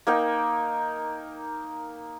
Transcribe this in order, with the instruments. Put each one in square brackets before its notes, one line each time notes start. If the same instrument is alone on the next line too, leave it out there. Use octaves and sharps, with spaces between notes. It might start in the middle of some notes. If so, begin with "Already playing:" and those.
[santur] A#3 D#4 A#4 G5